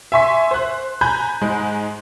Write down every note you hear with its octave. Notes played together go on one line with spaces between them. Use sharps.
E5 G#5 C6 C#6 B6
C5 F#6
G#5 A#5 B5 F#6 G6
G#2 G#3